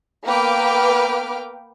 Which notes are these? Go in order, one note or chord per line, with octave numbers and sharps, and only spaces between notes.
A#3 B3 B4 G5 D6 F6